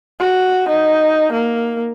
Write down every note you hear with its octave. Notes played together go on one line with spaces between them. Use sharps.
F#4
D#4
A#3